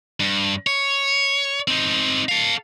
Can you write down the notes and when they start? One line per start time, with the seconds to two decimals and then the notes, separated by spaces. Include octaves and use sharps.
0.20 G2
0.67 C#5
1.68 C4 D#4
2.29 A4 F5